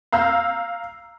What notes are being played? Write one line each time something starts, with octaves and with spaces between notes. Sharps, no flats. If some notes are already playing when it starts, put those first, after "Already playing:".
F5 A#5 E6 G6